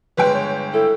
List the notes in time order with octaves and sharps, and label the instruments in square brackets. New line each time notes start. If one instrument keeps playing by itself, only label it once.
[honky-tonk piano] G1 G#3 G5 [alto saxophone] B4
[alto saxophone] C#5
[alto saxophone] E4 [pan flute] A4